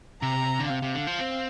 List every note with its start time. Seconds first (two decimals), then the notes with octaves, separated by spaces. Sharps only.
0.22 C3 A#5
0.59 D3
0.70 C3 F5
0.82 C3
0.95 D3
1.07 F3
1.19 C4